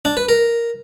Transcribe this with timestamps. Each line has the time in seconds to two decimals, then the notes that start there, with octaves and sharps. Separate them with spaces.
0.05 D4
0.17 B4
0.29 A#4